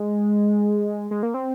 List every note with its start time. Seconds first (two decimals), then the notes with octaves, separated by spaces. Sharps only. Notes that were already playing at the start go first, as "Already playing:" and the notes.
Already playing: G#3
1.11 G#3
1.23 A#3
1.34 C4